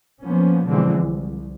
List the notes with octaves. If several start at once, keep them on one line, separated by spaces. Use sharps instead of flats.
F3 A#3 B3 C#4
B2 D3 E3 F3 G#3 C4
C2